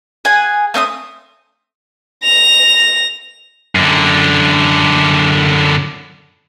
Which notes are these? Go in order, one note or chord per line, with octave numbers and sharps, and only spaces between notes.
G#4 F#5 G#5
A3 C4 E5 D#6
A#6 F7
F#2 D3